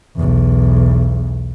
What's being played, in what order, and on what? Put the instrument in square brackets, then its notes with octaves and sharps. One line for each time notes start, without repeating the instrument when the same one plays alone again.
[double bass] B1 E2